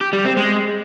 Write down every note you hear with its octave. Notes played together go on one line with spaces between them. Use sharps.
G4
G3
C4
G#3